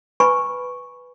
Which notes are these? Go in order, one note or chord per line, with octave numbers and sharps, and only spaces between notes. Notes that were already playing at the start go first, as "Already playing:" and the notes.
B4 G#5 B5 C#6